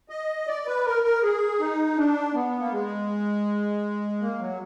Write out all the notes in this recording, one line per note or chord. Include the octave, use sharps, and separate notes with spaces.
D#5
D5
B4
A#4
A#4
G#4
D#4
D4
B3
A#3
G#3
A#3
F#3